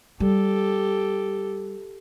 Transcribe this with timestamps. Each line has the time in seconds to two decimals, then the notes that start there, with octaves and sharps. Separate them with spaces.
0.20 G3 G4 A4